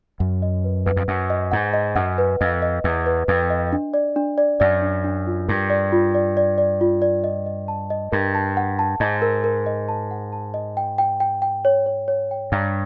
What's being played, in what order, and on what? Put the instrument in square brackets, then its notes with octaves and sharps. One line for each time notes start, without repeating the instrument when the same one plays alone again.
[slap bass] F#2 [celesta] F#5
[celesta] D#5
B4
[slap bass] E2 [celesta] B4
[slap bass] F2
[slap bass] F#2 [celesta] F#5
[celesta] D#5
[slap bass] G#2 [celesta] F#5
[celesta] D#5
[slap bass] F#2 [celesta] F#5
[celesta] B4
[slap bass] F2 [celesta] D#5
[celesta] D#5
[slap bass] E2 [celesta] B4
[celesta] B4
[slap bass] F2 [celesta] B4
[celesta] D#5
D4
D5
D4
D5
[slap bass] F#2 [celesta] D5
[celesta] D4
D4
F4
[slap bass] G2 [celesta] A#4
[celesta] D5
F4
D5
D5
D5
F4
D5
D#5
D#5
A5
D#5
[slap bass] G2 [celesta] A#4
[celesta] A5
F#5
A5
[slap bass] G#2 [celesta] D#5
[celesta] A#4
A#4
D#5
A5
F#5
A5
D#5
G5
G5
G5
G5
C#5
C#5
C#5
G5
[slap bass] G2 [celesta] A#5